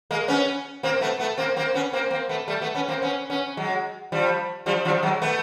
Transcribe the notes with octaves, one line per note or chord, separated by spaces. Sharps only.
G#3 A#3
B3 C#4
A#3 C4
A3 B3
A3 B3
A#3 C4
A#3 C4
B3 C#4
A#3 C4
A#3 C4
A3 B3
G3 A3
A3 B3
B3 C#4
A#3 C4
B3 C#4
B3 C#4
F#3 G#3
F3 G3
F3 G3
F3 G3
F#3 G#3
A3 B3